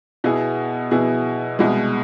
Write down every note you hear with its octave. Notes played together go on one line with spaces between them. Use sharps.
B2 B3 E4 G#4
B2 B3 E4 G#4
C2 B2 G#3